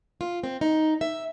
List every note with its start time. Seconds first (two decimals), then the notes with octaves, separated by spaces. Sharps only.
0.21 F4
0.43 C4
0.61 D#4
1.01 E5